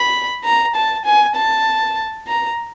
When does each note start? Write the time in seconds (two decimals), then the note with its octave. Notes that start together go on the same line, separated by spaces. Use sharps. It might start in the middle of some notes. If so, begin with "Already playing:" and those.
Already playing: B5
0.44 A#5
0.75 A5
1.05 G#5
1.35 A5
2.28 A#5